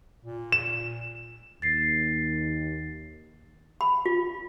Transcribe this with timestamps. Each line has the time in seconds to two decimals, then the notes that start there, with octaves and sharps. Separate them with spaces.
0.25 A#2
0.52 E7
1.62 D#2 A6 C7
3.81 B5
4.06 F4